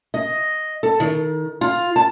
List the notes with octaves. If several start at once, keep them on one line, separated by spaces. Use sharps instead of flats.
D#5
A4
D#3
F4
A5